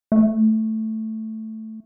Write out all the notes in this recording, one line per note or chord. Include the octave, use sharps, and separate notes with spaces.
A3